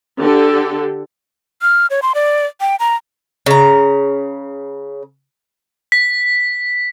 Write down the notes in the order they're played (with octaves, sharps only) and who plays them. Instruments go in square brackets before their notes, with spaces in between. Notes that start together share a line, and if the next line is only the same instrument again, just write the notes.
[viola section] D3 G4 A4
[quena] F6
C#5
C6
D5
G5
A#5
[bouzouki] C#3 A#5
[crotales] B6